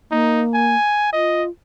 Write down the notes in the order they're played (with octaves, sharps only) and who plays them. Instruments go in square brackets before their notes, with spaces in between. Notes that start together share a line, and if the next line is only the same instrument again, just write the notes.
[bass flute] A#3 [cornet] D#4
[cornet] G#5
[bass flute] F4 [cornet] D#5